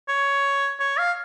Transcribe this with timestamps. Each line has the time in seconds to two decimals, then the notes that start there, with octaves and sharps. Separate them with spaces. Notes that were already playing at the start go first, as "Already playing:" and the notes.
0.09 C#5
0.80 C#5
0.99 F5